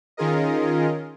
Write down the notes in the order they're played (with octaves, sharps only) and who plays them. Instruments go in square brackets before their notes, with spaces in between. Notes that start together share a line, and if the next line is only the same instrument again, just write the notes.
[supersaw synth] D#3 C#4 F4 G#4 A#4 D#5